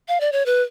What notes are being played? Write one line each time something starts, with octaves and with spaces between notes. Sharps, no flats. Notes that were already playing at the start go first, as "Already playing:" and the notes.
F5
D5
C#5
B4